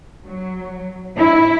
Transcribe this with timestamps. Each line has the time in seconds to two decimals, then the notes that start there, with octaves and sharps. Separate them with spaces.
0.24 F#3
1.17 E4